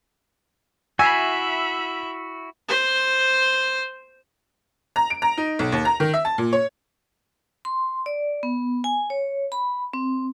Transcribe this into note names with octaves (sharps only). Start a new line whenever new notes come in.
E4 F#4 E5 G#5 B5 E6 B6 C7
C5 C6
A#5
D7
A#5
D#4
B1
D#2
A#5
D#3
E5
A5
A#2
C#5
C6
D5
B3
G#5
C#5
B5
C4